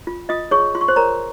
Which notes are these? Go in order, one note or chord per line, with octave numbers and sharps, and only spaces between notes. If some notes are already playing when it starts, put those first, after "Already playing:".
F4
F4 D#5 D#6
G#4 C#5 C#6
F4 C6
C#6
C5 C6
A#4 C#5 A#5